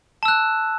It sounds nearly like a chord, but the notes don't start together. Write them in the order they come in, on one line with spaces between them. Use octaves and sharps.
A5 E6 F#6